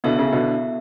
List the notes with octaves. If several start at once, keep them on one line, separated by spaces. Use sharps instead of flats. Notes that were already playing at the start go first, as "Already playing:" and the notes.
B2 D3 B3 E4 A4 E5
C#3
B2 D3